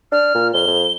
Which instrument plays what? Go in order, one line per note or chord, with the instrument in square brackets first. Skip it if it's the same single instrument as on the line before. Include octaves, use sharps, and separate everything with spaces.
[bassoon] D4 [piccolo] F6
[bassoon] A#2
[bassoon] F2 [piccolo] G7
[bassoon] F2